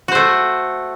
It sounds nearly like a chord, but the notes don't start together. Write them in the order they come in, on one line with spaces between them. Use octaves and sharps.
F#4 C5 A3